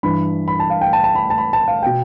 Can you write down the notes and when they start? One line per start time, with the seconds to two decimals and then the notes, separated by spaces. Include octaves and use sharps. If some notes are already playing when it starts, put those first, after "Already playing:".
0.03 G2 E3 B5
0.48 B5
0.60 A5
0.70 F5
0.81 G5
0.93 A5
1.04 A5
1.15 B5
1.30 A5
1.38 B5
1.53 A5
1.68 F5
1.83 B2 G5